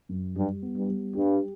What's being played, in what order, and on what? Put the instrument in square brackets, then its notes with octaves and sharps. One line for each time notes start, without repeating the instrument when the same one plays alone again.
[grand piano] F#2
[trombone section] G2 [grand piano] G3
[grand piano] B3
[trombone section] G2
[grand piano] G3
[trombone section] G2 [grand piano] G4